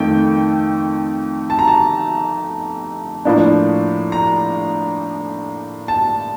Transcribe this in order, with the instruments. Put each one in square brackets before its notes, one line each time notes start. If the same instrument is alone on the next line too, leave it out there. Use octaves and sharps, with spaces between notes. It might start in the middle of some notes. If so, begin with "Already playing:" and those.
Already playing: [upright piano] F2 D#3 A3 G5
A5
A#5
A5
A2 F3 A#3 D4
A#5
A5